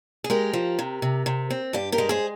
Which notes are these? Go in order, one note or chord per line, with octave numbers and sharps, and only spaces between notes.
G#4
G#3 G4 A#4
F3
C3
C3
C3
C4
G2 G4
G4 A#4
G#3
G#4 C5